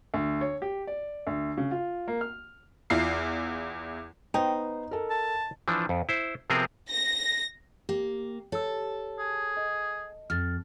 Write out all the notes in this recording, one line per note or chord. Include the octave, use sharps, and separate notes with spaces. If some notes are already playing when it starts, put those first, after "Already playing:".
D2
C#5
G4
D5
D2
C#3
F4
A#3
F6
E2 E4 F4 C7
B3 D#4 C5 G5
A4 A#4
A5
E3 F3 D4
F2
E4 C5
C3 F3 B3 C4 G#4 A#4
A#6
A#3 G4
A4 C#5 E6
G#4
D#5
F2 F6 A6